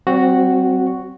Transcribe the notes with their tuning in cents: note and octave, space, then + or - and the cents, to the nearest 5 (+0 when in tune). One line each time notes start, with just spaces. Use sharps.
G3 -45 C4 +0 F#4 +0